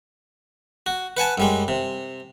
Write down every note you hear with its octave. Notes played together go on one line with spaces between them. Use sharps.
F#4
B4 F#5 G#5 A5
F#2 G3 G#3
C3